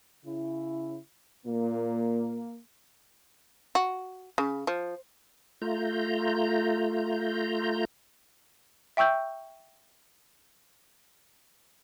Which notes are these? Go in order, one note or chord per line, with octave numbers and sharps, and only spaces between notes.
C#3 E4
A#2 A#3
F#4
C#3
F3
A3 F4 A#5 G6
E5 G5 C#6 E6 G6